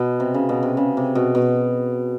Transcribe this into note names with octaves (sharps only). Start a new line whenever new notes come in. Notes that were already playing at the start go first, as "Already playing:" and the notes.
Already playing: B2
C3
C#3
B2
C3
C#3
C3
B2
B2